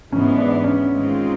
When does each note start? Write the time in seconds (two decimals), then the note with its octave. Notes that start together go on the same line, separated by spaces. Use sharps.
0.12 G#2 E3 G#3 B3 C#4
0.38 D4
0.54 D4
0.64 C#4
0.91 G#2 D#3 G#3 C4 F4